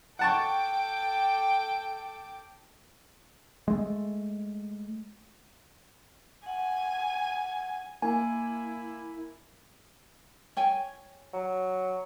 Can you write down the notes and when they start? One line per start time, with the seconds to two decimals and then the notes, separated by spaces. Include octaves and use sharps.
0.19 A4 F#5 G5 A5 C#6 D6
3.68 G#3 A3
6.46 F#5 G#5
8.02 A#3 E4 G#5
10.57 C#5 G5 G#5
11.33 F#3